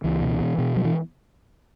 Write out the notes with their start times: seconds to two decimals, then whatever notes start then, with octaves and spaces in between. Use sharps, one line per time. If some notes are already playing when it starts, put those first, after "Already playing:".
0.04 C#2 E3
0.22 B2
0.41 B2
0.58 B2
0.77 F#3
0.85 E3